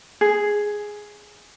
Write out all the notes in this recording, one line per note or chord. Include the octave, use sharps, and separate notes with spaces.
G#4